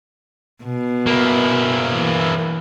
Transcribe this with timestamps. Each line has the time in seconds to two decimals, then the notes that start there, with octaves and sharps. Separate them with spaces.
0.64 B2
1.07 A#3 E4
1.91 E3